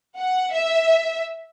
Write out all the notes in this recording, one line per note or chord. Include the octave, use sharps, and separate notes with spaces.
F#5
E5